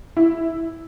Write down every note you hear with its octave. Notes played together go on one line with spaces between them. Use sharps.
E4